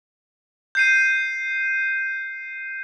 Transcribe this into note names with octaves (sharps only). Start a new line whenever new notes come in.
G6 C7 D#7